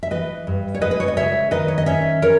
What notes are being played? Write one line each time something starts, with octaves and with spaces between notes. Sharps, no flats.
E5
E3 B4 D#5
G2
C#5
G#3 B4 D#5
B4
C#5
D#5
C#3 C#5 E5
D#3 B4 D#5
C#5
D#5
C#4 C#5 E5
E3 A#4 C#5